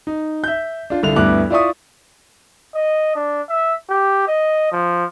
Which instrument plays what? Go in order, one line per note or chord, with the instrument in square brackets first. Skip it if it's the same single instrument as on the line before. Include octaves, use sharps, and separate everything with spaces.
[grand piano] D#4
E5 G6
D4 F4
C2 D3 F4 F7
D2 G2 B3 E4 D6 F#6
E4 F4 D5 E5 C#6 D#6
[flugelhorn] D#5
D4
E5
G4
D#5
F3